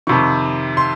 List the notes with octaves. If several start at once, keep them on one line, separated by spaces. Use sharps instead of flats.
F2 C3 D#3 C#6
C6